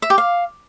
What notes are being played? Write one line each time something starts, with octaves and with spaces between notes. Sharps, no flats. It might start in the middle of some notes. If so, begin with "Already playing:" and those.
E5
G4
F5